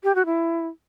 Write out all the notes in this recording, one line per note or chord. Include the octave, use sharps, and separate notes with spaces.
G4
F#4
E4